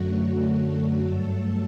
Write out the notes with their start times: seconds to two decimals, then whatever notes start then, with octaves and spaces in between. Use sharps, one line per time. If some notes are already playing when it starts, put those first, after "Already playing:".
Already playing: F#2 D3 F#3 A3 F#4
1.06 G2 F#3 A3 A4